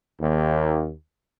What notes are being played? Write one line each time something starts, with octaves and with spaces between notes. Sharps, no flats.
D#2